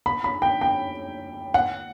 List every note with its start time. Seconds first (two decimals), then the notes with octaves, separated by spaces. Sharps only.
0.06 B5
0.24 B5
0.42 G5
0.61 G5
1.54 F#5